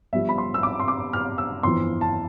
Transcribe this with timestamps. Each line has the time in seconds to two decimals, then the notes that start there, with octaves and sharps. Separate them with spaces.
0.13 G1 G2 F3 E5
0.29 B5
0.38 C6
0.54 E6
0.63 D6
0.80 C6
0.88 D6
1.13 F6
1.38 E6
1.63 G1 F2 E3 C6
2.01 A5